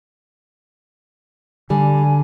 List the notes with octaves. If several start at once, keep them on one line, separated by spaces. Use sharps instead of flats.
D3 G3 G#5